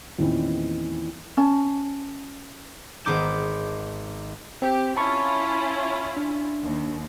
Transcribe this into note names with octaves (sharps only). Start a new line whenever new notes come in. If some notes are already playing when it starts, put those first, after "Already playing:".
E2 A#2 D#3 E3 C4 C#4
C#4 A5
G#1 B3 D#4 D6 G6 E7
C4 G4
C#4 E4 F4 A5 B5 C#6
D4
D#2